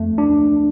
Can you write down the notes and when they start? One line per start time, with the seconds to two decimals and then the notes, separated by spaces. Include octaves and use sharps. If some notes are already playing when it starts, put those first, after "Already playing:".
Already playing: F2 A3
0.18 D4